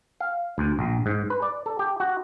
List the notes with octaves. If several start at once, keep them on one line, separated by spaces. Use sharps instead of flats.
F5
D2
A#1
G#2
B4
D5
A4
G4
F#4